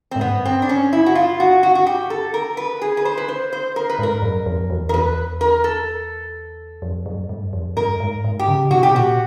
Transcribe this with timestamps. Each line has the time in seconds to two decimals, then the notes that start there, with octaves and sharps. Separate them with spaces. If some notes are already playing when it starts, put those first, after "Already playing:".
0.11 C4
0.16 G#2
0.21 G2 B3
0.45 C4
0.62 D4
0.69 C#4
0.93 E4
1.06 F#4
1.15 F4
1.40 F#4
1.63 F#4
1.75 F#4
1.87 G4
2.10 A4
2.34 A#4
2.57 B4
2.82 G#4
2.97 B4
3.05 C5
3.17 B4
3.28 C5
3.53 C5
3.76 A#4
3.90 B4
3.99 G#2 A#4
4.22 F#2
4.46 F2
4.70 E2
4.89 A#4
4.94 E2 B4
5.41 A#4
5.64 A4
6.82 F2
7.06 F#2
7.29 G2
7.53 F2
7.77 G2 A#4
8.00 G#2
8.24 G#2
8.39 G4
8.48 C#3
8.71 C3 F#4
8.83 G4
8.88 B2
8.94 A#2 F#4